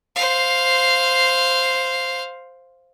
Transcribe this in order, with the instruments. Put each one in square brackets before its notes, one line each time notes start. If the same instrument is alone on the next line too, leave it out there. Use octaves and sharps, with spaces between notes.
[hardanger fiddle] C5 F5